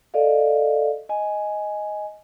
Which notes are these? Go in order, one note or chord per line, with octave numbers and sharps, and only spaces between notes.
A4 D5 D#5 F5
D#5 G#5